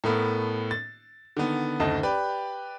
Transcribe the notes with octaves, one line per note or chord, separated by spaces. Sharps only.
A2 A3 B3 A#4
A6
D3 D#3 B3
F#1 D2 D#3 A3 D#5 A5
G4 B4 D5